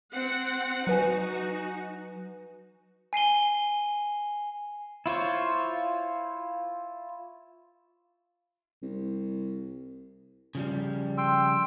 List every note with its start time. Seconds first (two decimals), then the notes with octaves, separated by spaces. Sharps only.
0.14 C4 F#5
0.87 F#3 D#4 F#4 B4 G#5
3.13 G#5 C7 D#7 G7
5.06 E4 F4 C5 C#5
8.83 C2
10.55 C#3 F3 G3
11.18 G5 C6 E6